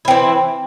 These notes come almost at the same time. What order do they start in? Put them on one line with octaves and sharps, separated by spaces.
E4 C4 E3